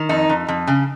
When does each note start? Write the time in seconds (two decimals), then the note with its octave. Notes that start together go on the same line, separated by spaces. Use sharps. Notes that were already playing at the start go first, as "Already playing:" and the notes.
Already playing: D#3
0.09 F2 D#4
0.29 F2
0.48 F2
0.67 C#3